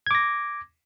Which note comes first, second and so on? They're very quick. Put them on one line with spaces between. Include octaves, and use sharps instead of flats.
G#6 D6 A#6